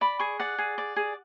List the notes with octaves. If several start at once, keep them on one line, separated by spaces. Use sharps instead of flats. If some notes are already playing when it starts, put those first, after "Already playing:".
D5 B5
G#4 C#6
D5 F#5
G#4
D5
G#4